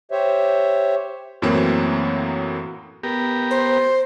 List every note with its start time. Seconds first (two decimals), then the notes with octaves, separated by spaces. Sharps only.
0.12 G4 C5 C#5 E5
1.42 F#2 A2 E3 F#3 A#3 C4
3.03 B3 G4 A#4
3.51 C5